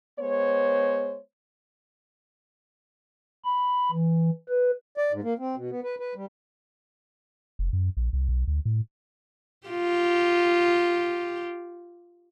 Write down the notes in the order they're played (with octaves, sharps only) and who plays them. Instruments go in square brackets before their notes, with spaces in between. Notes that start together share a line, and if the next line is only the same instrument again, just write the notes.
[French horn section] G#3 B3 C5 C#5
[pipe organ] B5
E3
B4
[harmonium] D5
G#2
A#3
C4
B2
B3
B4
B4
G3
[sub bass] F1
F#2
A#1
C2
B1
D2
A2
[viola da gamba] F4 G4